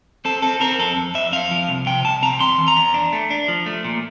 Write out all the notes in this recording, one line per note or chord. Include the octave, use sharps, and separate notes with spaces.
C4 A4
C4 A4
C4 A#4
F2 A4
F2
F2 E5
C4 F5
F3
C2
C3 G5
C2 A5
C4 A#5
E2 C6
E3
A#5
E2
D4
A3
D4
F3
A3
A#2